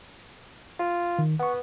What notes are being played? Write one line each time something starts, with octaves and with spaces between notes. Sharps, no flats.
F4
D#3
B3 F#5 C#6